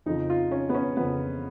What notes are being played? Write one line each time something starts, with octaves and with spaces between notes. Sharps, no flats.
F2 C#3 F3 D#4
F4
C#4
B3
C#4
F2 C#3 F3 B3